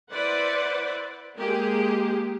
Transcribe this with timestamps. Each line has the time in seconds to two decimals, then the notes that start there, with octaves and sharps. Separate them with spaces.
0.12 E4 B4 C5 D5 F#5
1.37 G#3 A#3 G4 G#4